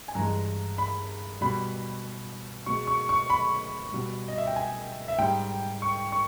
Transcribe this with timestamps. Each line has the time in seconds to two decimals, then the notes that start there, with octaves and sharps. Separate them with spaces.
0.08 G#5
0.15 G2 E3 G#3 A#5
0.78 B5
1.41 B2 G3 B5
2.66 B2 G#3 C#6
2.87 C#6
3.09 C#6
3.30 B5
3.92 B2 G3
4.28 D#5
4.38 E5
4.47 G5
4.56 G#5
5.08 E5
5.18 G#2 G3 G5
5.82 C#6
6.12 C#6